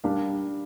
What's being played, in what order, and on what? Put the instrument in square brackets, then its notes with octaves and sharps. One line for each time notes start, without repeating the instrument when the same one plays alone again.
[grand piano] G3 D4 G4 A#4 F5